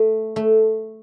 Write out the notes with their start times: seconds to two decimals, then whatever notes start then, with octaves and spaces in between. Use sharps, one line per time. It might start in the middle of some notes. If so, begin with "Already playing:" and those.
Already playing: A3
0.36 A3